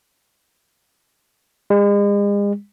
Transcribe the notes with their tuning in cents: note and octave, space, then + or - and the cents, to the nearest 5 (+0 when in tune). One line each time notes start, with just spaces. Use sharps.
G#3 -40